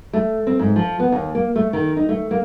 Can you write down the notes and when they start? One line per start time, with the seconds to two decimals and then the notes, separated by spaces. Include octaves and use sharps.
0.13 A3
0.47 C4
0.59 G#2
0.76 F3
1.00 B3
1.12 D#2
1.35 A#3
1.56 A3
1.73 D#3
1.97 D#4
2.09 A3
2.31 A#3